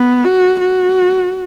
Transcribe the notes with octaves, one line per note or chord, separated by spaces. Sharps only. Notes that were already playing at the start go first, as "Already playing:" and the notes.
Already playing: B3
F#4
F#4